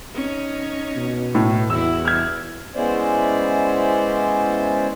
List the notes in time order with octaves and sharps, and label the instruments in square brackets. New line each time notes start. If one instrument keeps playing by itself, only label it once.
[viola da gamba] C#4 D#4
[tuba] B2
[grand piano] A2
[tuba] E2 [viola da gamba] E4 F#4 [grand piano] E6
[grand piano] F6 G#6
[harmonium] G#3 B3 C#4 E4 C5 D5